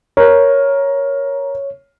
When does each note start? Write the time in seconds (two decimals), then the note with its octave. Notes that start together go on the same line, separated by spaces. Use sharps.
0.17 A#4 C#5